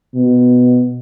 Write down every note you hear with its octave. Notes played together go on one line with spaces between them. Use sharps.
B2